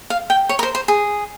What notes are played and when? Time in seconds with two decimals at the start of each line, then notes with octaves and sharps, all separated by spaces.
0.10 F5
0.30 G5
0.49 C#5
0.59 A#4
0.63 C5
0.75 C5
0.88 G#4